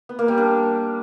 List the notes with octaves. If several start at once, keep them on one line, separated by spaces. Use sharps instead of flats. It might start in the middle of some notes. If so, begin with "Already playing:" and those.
B3
A#3
G3
D4